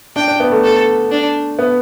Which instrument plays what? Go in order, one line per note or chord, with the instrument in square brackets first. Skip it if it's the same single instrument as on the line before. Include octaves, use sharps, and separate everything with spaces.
[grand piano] D4 [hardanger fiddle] G5
[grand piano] D4
B3
A3
[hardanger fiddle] A4
D4
[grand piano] B3